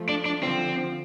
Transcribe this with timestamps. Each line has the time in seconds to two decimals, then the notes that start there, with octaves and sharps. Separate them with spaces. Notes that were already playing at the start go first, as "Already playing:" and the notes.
Already playing: F3 A3
0.09 D4
0.26 D4
0.43 D3 F3 C4